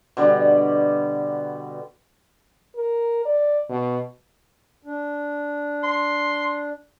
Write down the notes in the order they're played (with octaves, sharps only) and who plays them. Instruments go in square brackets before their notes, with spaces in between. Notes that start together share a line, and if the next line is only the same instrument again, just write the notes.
[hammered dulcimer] B2 D3 G3
[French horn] A#4
D5
B2
[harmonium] D4
[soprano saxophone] C6